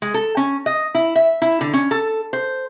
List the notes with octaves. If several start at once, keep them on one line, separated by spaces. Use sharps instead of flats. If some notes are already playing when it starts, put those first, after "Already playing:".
G#3
A4
C#4
D#5
E4
E5
E4
D3
C#4
A4
C5